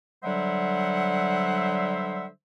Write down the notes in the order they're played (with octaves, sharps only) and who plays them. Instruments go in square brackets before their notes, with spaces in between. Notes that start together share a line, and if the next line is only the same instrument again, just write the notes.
[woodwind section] D3 F#3 G3 C5 E5 F#5